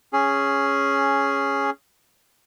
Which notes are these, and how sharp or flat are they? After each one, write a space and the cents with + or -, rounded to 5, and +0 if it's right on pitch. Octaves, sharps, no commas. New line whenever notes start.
C#4 +0 G#4 +0